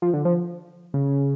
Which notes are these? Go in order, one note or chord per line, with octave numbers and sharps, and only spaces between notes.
F3
D3
F3
C#3